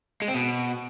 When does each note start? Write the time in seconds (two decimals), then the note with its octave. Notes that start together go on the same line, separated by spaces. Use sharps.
0.22 G#3
0.28 C4
0.35 B2